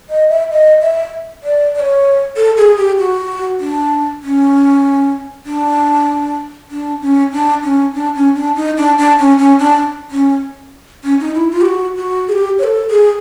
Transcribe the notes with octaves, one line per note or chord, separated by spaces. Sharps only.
D#5
E5
D#5
E5
D5
D5
C#5
A4
G#4
G4
F#4
D4
C#4
D4
D4
C#4
D4
C#4
D4
C#4
D4
D#4
D4
D4
C#4
C#4
D4
C#4
C#4
D#4
E4
F4
G4
F#4
F#4
G#4
G4
C#5
A4
G#4